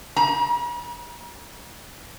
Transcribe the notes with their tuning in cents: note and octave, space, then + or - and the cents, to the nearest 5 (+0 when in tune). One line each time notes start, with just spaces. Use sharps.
A#5 +40